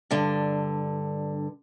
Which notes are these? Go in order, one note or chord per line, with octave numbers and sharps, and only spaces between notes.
G2 D3